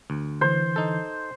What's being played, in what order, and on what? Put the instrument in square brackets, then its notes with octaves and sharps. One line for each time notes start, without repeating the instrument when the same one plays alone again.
[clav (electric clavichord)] D2
[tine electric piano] D3 E3 [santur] C5
[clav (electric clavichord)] D#4 A4